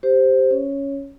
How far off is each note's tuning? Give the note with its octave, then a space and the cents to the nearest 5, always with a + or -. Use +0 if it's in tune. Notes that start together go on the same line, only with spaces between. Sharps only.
G4 +0 C5 +0
C#4 +0 C#5 +0